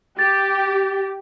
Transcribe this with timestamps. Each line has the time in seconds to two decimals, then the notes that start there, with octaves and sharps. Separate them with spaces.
0.19 G4 A6